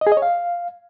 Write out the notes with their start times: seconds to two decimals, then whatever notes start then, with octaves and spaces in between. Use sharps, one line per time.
0.01 D#5
0.07 G#4
0.12 D#5
0.17 C#5
0.22 F5